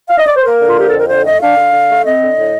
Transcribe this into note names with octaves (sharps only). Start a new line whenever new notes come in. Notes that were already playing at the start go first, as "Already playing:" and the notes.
F5
D#5
D5
C5
A#3 A#4
D3
F4
F3 G4
F2 A4
A#4
D3 C5
A3 D#5
D4 F5
D3
D3
A3
C4 D#5
D3
A2